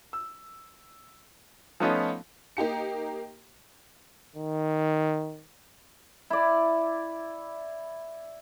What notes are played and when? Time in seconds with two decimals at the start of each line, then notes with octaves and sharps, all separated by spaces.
0.13 E6
1.80 F3 A3 B3 C#4 D#4 F4
2.57 A#3 D#4 G4 C#7
4.36 D#3
6.30 E4 D5